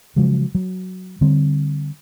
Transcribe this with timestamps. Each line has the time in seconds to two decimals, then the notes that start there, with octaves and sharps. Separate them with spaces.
0.16 C#3 F3 F#3 G#3
0.55 F#3
1.21 D3 G3 C4